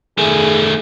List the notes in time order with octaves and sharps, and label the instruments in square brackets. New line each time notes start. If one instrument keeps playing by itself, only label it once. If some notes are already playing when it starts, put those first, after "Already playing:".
[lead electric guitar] D#3 A3 [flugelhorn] G#4